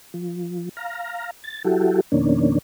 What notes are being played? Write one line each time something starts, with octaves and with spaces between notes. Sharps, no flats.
F3
F5 A#5
A6
F#3 E4 F#4 G4 A4
F2 B2 D#3 A#3 C#4 D4